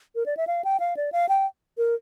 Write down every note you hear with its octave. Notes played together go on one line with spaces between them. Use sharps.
A#4
D5
E5
F5
G5
F5
D5
F5
G5
A#4